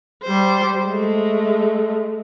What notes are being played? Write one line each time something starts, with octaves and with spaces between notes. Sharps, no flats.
G3 C5
G#3 A3